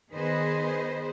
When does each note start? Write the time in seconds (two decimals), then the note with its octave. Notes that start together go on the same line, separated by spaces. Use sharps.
0.14 D#3 B3 G#4 B4 C5 D#5